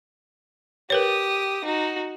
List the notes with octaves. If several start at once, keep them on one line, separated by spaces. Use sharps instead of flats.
G4 A#4 B4 C#5 D#6
D#4 F#4